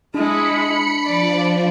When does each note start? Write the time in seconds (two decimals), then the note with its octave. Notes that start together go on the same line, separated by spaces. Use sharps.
0.14 G#3 D4 E4 B5 C#7
1.06 F3 D5